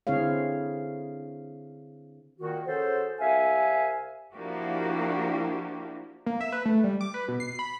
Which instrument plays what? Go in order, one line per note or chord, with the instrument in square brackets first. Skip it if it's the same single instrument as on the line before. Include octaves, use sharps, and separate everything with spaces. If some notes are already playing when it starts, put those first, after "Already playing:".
[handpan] D3 C4 E4 G#4 C#5 F5
[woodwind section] A#2 D#3 F#4
C#4 F#4 G#4 A4 C5
C2 E5 F5 G#5
[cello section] F3 A#3 D4 E4 F#4 G4
[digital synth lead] A#3
E5
B4
A3
G3
D6
B4
B2
C7
B5